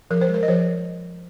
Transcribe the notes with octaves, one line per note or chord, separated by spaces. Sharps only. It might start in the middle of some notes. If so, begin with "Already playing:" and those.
F3 A#4
C5
G#3
A#4
D#5
F3 C5